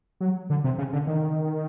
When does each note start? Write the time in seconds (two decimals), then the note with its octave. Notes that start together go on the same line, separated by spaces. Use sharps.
0.21 F#3
0.50 D3
0.64 C3
0.78 C#3
0.93 D3
1.07 D#3